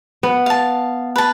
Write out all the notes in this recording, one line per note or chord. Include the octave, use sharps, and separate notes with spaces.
B3
F5 A5
B4 A5